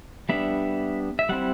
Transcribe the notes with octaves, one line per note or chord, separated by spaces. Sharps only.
G3 B3 D4 E5
E5
G3 C4 E4 F#5